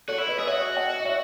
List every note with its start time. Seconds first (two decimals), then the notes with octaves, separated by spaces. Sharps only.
0.08 F#4 A4 C#5
0.18 E4
0.28 B4 D#5
0.39 G#4
0.47 F#4 C#5 E5
0.77 D#5 F#5
1.00 D#5
1.05 C#5 E5